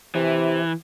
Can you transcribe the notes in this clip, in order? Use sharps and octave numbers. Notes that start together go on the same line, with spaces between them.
C3 E3